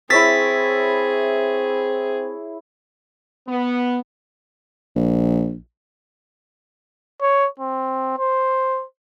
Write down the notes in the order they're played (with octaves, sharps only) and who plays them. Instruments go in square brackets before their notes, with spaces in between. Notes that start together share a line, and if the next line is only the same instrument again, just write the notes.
[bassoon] C4 [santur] E4 C#5 E5 [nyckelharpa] G#4 [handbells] A6 B6
[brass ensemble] B3
[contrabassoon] A#1
[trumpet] C#5
C4
C5